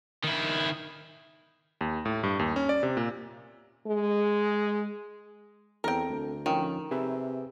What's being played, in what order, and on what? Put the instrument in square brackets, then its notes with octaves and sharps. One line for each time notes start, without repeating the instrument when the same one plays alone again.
[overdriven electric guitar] D#3 E4
[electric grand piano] D#2
A2
G2
D#2
C#4
D5
C3
A#2
[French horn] G#3
[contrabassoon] E2 [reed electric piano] C4 A4 [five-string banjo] A#4 G5
[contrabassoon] D2
[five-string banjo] D#3 [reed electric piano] F3 C#4 F4
[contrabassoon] C3 [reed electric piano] G#4 B4 E5